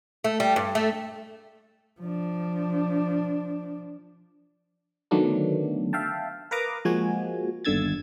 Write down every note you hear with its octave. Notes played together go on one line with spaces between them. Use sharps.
A3
G3
G2
A3
F3 D4
D3 D#3 F#3 A3 B3 D4
E5 F5 G5 A5
A#4 B4 F5 A#5 D6 D#6
F3 G#3 A#3 F#4 G#5
G1 D#2 D3 E6 G#6 A6